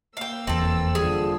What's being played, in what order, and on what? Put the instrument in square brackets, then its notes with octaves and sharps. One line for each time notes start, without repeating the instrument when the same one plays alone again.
[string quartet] A#3 E6 [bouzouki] F5 G5
[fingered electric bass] F1 E2 [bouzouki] C4 A4
[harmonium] D3 F3 G3 [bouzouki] G#4